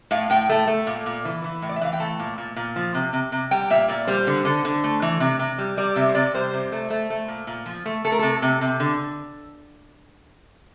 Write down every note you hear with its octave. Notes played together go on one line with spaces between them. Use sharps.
A2 F5
A2 G5
A3
A3
A#2
A#2
E3
E3
A2
D5
E5
E3 F5
G5
A3 A5
A#2
A#2
A#2
F3
C3
C3
C3
G3 G5
A#2 E5
A#2 D5
G3 C5
D3
D3
D3
A3
E3
C3
C3
G3
G3 D5
C3 E5
C5
C3 D5
G3 C5
C3
A3
A3
A3
A#2
A#2
F3
A3
A3 A4
A#4
C3 A4
C3
C3
D3